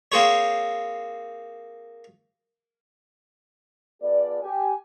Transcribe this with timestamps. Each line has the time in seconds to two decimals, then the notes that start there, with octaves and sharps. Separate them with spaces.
0.12 A#3 C4 G#4 C5 C#5
4.02 B3 F4 G#4 A4 B4 D5
4.42 G4 G#5